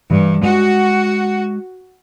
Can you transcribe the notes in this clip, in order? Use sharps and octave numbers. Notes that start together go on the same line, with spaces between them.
G2 E3
G#3 F#4